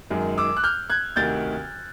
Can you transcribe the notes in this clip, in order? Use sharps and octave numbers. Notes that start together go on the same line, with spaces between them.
F#2 D#3 G#3
D6 E6
F#6
F6 G6
F#6 G#6
D2 C3 D#3 G6 A6